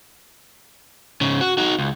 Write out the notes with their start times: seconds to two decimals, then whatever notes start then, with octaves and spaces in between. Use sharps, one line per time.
1.21 G#2 C#3
1.41 F#4
1.57 D#4 F#4
1.79 C#2